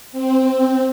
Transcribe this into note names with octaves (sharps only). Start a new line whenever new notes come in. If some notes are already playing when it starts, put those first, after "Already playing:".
C4